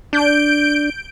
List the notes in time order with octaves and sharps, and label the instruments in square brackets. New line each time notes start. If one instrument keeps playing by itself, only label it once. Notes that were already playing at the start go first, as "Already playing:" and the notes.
[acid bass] D4 [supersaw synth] G6 D7